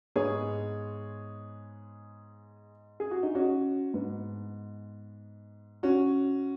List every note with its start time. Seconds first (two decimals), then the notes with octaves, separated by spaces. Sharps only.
0.16 G#2 G#3 B3 G#4 C#5
3.00 G#4
3.11 F#4
3.23 D#4
3.35 C#4 F#4
3.94 G#2 G#3 B3
5.83 C#4 F#4